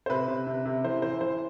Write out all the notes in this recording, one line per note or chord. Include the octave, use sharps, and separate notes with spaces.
C5
C3 B4
C3
C3
C3
E3 C5
E3 C5
E3 C5